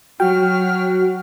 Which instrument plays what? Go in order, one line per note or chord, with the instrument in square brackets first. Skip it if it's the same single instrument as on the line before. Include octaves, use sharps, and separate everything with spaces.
[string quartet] F#3 [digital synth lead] F#4 [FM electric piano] G5 [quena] F6